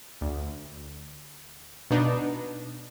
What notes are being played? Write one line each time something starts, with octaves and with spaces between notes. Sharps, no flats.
D2
B2 B3 D4 D#4